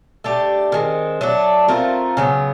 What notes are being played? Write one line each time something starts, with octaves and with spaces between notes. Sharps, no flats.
A3 D4 G4
D#3 G#3 C4
F#3 A3 D4
A3 C4 F4 A#4
C#3 F#3 B3